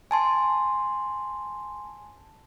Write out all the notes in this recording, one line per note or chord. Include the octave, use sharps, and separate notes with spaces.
G#5 A5 C6